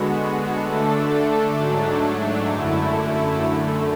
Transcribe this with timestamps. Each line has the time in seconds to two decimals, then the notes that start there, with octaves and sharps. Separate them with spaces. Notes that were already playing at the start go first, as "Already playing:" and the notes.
Already playing: D3 G#3 B3 F#4
0.62 D3 A3 D4 A4
1.56 G#2 F#3 A3 D4
2.51 F#2 D3 A3 E4
3.46 F#2 D3 A3